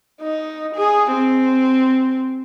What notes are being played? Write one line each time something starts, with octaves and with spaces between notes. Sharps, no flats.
D#4
G#4
C4